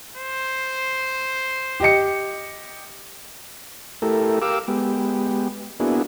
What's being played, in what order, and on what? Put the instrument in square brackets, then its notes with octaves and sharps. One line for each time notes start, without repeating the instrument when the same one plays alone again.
[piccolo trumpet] C5
[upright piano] G4 D#5 C#7
[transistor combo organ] A3 E4 G4 A4 A#4
G4 A#4 F5 D6 E6
G#3 B3 G4
A#3 B3 D4 E4 F#4 G#4